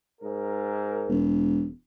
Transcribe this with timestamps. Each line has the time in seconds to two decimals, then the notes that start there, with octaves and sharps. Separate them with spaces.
0.21 G#2 A#4
1.09 E1